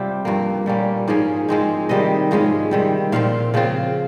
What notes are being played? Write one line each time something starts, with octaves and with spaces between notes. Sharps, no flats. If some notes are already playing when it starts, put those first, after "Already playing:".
Already playing: C3 G3 C4 F4 G4
G2 F3 A#3
A#2 G3 A#3 C#4
G#2 F3 A#3 C#4 G#4
F3 G#3 C4 D#4
C3 D#3 G3 A#3 D#5
G#2 F3 G#3 C#4
C3 D#3 G3
A#2 F3 C4 F5
C#3 F3 C4 F4